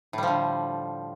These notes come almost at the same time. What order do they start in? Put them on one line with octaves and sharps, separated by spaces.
A2 G3 F3 D3